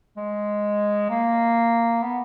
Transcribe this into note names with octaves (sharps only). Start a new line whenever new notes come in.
G#3
A#3
B3